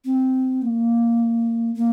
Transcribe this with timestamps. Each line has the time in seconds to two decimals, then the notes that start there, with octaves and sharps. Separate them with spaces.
0.05 C4
0.62 A#3
1.75 A#3